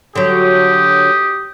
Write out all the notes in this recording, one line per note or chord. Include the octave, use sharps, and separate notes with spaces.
D3 F#3 G4 D#6